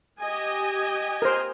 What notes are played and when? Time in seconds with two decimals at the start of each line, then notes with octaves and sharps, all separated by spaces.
0.21 G4 D#5 G#5
1.22 A#4 C5